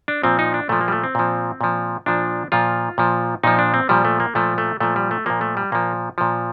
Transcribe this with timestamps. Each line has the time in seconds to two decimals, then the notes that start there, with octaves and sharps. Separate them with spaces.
0.08 D4
0.23 A#2 F3 C4
0.39 D#4
0.54 D4
0.69 A#2 F3 A3
0.81 A#3
0.88 G3
0.92 A3
1.04 C4
1.15 A#2 F3
1.61 A#2 F3
2.06 A#2 F3 D4
2.52 A#2 F3 F4
2.98 A#2 F3
3.44 A#2 F3 D#4
3.59 D4
3.74 C4
3.89 A#2 F3 G3
4.05 A3
4.20 A#3
4.35 A#2 F3 A3
4.58 A3
4.80 A#2 F3 A3
4.96 G3
5.11 A3
5.26 A#2 F3 A#3
5.41 A3
5.57 G3
5.72 A#2 F3 A#3
6.18 A#2 F3